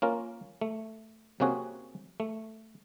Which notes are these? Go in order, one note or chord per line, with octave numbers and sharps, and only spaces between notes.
A#3 C#4 F4 A#4
A3
C3 A#3 C4 C#4 F#4 G#4
A3